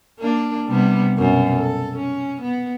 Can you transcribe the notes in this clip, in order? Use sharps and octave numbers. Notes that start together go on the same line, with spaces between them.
A#3 D4
C3 G3 B3
F#2 B2
A4
C#4
B3